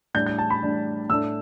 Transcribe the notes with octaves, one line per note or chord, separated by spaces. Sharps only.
A2 G3 D4 G6
G6
A5
B5
A2 G3 D4
A2 A3 D4 E6